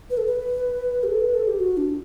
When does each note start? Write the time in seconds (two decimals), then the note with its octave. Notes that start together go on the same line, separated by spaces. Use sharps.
0.10 B4
0.18 A4
0.26 B4
1.03 G4
1.08 A4
1.21 B4
1.34 A4
1.48 G4
1.60 F#4
1.77 D4